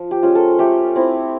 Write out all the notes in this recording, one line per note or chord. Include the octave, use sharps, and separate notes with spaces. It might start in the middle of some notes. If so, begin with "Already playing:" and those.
Already playing: F3
G4
G#3 C#4 F4
A4
A3 G4
C4 E4